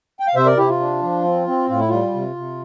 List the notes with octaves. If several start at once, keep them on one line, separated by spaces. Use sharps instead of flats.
G5
F5
C3 C5 E5
A#4 D5
C3 E4 G4
F4
D4
F3
C4
C4
A2 F4
E4
G3 F4
C3
C3